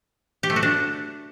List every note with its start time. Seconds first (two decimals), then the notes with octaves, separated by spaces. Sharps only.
0.43 G4
0.50 A3
0.56 F#4
0.63 D4